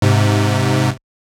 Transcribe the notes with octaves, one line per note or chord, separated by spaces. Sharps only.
G#2 C3